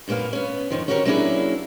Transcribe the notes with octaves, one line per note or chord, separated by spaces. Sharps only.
F#2 A#2 A#3 B3 F5
B3 C#4
F#2 D#3 F3
C#4 F#4 G4 A#4 C5 C#5
F#3 A#3 C#4 D4 E4 G#4